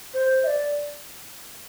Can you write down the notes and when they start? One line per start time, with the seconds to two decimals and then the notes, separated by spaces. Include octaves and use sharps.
0.14 C5
0.43 E5
0.47 D5